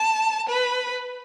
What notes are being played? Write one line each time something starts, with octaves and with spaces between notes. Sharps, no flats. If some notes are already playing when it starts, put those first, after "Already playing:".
Already playing: A5
B4